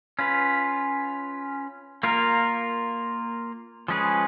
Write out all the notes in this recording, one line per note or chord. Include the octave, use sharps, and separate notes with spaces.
C#4 F4 B4
A#3 F4 A#4
F3 G#3 C#4 G#4 B4